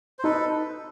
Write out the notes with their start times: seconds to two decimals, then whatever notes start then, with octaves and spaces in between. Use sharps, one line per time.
0.19 C5
0.24 D#4 A4 B4